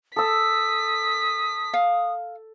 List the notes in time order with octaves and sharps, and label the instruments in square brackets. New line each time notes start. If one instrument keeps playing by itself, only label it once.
[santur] A4 E6 [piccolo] D#6 [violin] B6
[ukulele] F5